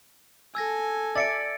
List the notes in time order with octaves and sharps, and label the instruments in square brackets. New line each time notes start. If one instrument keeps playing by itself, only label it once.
[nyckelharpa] A4 G#5 [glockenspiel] E6 G#6 A#6
[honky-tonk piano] D5 E5 [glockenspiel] A6 C#7 D7